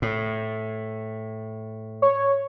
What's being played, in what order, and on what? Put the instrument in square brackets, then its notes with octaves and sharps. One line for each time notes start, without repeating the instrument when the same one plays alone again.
[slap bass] A2
[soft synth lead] C#5